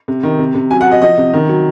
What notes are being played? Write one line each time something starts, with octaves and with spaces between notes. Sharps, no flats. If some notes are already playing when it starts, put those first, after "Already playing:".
C3
D#3
C3
C3
F#3 G#5
F#5
F#3
D#5
F3 D#5
C3
D#3
F#3